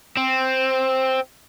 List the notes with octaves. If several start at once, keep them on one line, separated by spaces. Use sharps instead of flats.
C4